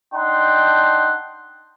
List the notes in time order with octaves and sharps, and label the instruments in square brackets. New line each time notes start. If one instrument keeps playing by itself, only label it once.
[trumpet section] D4 D#4 F#5 G5 C6